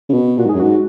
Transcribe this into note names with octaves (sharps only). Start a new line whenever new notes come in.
C#3
B2
A#2 F#4
G#2
F#2 G#4
G#2 F#4